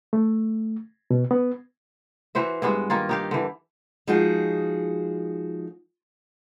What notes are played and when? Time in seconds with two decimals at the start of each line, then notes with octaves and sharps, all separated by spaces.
0.13 A3
1.11 B2
1.31 B3
2.35 E3 F#4 C5 E5
2.62 G2 G#3 B3 F#4
2.90 D#3 A#3 F4
3.09 D#4 G4 F5
3.31 D3 E3
4.07 F3 G#3 D#4 F#4 G#4